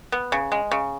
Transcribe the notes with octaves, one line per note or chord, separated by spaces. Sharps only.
B3
C#3
G#3
C#3